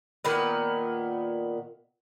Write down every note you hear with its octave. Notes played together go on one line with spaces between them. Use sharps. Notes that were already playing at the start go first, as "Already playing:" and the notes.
A#2 D#3 B3